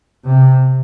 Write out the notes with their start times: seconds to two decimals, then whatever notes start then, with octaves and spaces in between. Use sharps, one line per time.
0.25 C3